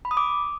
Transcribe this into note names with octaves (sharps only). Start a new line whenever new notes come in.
B5
D#6
D6